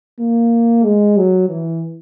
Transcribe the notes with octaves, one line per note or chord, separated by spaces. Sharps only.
A#3
G#3
F#3
E3